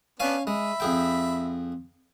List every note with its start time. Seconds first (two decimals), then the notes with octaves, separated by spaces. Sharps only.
0.20 B3 C#4 D4 F5 G#5
0.47 G#3 E5 B5
0.80 F2 G#4 G5